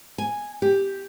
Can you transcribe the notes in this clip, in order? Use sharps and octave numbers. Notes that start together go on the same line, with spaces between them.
G#5
G4